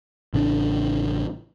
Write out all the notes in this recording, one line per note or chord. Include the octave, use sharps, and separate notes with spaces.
A1 C#3 C#4 D4